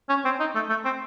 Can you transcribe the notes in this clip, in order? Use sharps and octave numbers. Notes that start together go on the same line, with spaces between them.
C#4
C4
D#4
A3
A3
C4